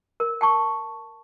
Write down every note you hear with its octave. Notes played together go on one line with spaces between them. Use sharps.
A#4
G5 A5 C#6